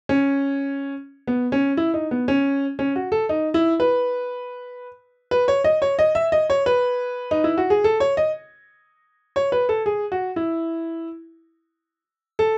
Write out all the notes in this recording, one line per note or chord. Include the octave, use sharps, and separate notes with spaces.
C#4
B3
C#4
E4
D#4
B3
C#4
C#4
F#4
A4
D#4
E4
B4
B4
C#5
D#5
C#5
D#5
E5
D#5
C#5
B4
D#4
E4
F#4
G#4
A4
C#5
D#5
C#5
B4
A4
G#4
F#4
E4
A4